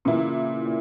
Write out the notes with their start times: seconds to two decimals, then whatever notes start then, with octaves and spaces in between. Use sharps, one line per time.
0.05 A#2 C#3 E3 A#3 E4
0.65 A#2